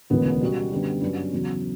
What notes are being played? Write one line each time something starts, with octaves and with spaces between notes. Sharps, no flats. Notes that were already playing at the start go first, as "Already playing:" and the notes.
E1 D2 C#3 E3 B3
B2 G3 C#4 F#4
F#2 D3 G3 B3 D4
G2 F#3 C#4
E2 C#3 F#3